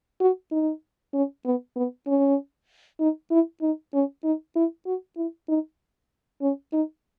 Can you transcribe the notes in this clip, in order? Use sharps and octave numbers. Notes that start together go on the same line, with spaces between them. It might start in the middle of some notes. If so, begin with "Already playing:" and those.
F#4
D#4
C#4
B3
B3
C#4
D#4
E4
D#4
C#4
D#4
E4
F#4
E4
D#4
C#4
D#4